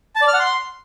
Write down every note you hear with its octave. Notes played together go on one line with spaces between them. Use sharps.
A5
D5
F6
F#5
C6